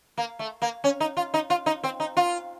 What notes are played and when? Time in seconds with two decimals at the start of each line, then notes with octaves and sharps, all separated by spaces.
0.17 A#3
0.39 A3
0.62 A#3
0.84 C#4
1.00 D#4
1.17 F4
1.34 D#4
1.50 F4
1.66 D#4
1.84 C4
2.00 D#4
2.17 F4